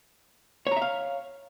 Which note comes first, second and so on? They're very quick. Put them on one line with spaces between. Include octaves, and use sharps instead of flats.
C#5 A#5 E5 F5